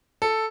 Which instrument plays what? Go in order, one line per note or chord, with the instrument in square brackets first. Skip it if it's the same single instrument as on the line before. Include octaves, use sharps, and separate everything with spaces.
[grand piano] A4